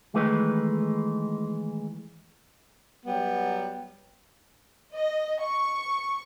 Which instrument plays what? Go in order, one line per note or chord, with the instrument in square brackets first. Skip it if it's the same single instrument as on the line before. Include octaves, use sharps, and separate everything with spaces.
[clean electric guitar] D#3 E3 G#3 A3 B4
[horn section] F#3 G3 B3
[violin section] D#5
C#6